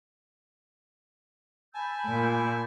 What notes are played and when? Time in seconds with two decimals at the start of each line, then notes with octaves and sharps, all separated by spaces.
1.74 G#5 A5 B5 E6 G6
2.05 A#2